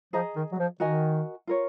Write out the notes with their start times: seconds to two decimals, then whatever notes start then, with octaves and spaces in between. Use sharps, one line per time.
0.13 F3 G#4 D#5 A#5
0.36 D#3
0.52 F#3
0.58 F3
0.80 D#3 F#4 A#4 D#5 G#5
1.47 F4 A#4 C#5